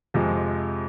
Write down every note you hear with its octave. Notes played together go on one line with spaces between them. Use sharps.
F2 C3 F3 G#3